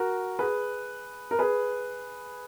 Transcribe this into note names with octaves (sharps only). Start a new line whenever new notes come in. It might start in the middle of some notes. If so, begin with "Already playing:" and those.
Already playing: F#4 A#4
G#4 B4
A#4
G#4 B4